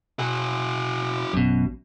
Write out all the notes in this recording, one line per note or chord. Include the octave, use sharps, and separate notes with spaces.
B2 F#4 G#4
A1 F#2 B2